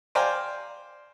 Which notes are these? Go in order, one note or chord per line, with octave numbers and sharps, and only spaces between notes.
C5 D5 F5 G5 G#5 A#5